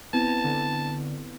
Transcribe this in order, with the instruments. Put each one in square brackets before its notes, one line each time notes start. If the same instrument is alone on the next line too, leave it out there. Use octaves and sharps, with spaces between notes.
[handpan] B3 C4 E4 [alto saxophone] A5
[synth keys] D3